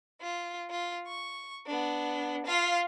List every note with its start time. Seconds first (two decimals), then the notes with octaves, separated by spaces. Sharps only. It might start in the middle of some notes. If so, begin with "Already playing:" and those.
0.21 F4
0.71 F4
1.08 C#6
1.67 B3 D4
2.46 F4 F5